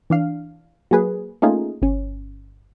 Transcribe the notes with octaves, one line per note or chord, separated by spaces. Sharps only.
E3 D4 F5
F#3 A#3 G#4 B4
A3 A#3 C#4 D#4 F4 G#4
G1 C#4